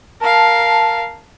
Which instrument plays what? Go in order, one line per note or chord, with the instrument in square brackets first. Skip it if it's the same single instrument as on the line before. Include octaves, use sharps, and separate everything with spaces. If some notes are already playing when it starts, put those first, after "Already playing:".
[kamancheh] A#4 F5 [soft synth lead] A5